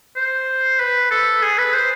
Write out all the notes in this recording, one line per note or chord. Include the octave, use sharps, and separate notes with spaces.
C5
B4
A4
G#4
B4
C5